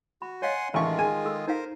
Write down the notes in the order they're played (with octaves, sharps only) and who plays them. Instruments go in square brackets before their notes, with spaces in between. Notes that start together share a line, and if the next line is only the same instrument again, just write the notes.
[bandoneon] F#4 [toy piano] B5
[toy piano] C#5 D#5 F5 [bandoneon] F#5 G#5 C6
[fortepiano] A1 C#6 [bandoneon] D#3 G#3 F4 [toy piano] F5 G#5 A5
[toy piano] G#4 [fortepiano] G#5
[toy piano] A4 E6
[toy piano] D#4 F5 [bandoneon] A#4 C5